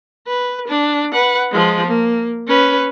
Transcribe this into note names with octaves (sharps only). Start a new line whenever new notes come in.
B4
D4
B4 F#5
F3 G#3
A#3
C#4 B4